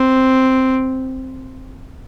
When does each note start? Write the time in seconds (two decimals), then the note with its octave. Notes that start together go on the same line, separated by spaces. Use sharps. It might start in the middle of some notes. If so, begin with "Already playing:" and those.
Already playing: C4